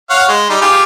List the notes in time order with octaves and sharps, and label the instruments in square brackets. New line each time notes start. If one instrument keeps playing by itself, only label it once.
[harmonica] C#5 F5 F#5
G#3
G3 D#4
F4 G4 G#4